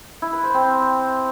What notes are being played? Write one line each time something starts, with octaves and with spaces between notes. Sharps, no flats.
E4
B4
C5
C4